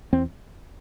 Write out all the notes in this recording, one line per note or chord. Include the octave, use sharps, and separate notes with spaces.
E2 C4